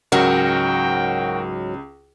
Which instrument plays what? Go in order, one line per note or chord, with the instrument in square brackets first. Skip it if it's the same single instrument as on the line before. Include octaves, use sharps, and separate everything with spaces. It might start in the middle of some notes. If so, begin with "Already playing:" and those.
[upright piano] C#2 [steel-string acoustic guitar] G#2 F#3 C#4 [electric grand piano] F#4 A#4 [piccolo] G5